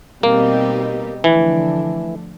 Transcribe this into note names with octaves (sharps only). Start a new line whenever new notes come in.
B2 G3 A#3 C4 D#4 G4
D3 E3 F3 A3 D4